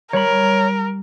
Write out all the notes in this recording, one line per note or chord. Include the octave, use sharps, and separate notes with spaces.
G3 A#4 C#5 B5